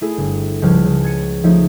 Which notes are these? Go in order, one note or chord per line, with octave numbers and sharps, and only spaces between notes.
A3 E4 G#4
G1
C#2 F3 G3 A5 F6 G#6
C#3
G#6 A6 C#7 D#7
F3 A3 D#4 C#5 E5